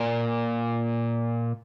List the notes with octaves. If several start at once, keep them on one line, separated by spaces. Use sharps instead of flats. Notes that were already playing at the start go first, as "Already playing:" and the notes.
Already playing: A#2